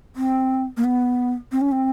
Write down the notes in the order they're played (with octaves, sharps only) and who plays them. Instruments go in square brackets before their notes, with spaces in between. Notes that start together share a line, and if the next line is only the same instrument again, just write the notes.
[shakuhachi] C4
A#3
B3
C4
C#4
C4